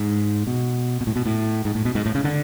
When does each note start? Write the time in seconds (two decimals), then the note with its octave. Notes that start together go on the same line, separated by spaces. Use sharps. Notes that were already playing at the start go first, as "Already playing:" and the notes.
Already playing: G#2
0.47 B2
1.01 B2
1.07 A2
1.16 B2
1.26 A2
1.65 G#2
1.75 A2
1.85 B2
1.95 G#2
2.06 A2
2.15 C#3
2.24 D3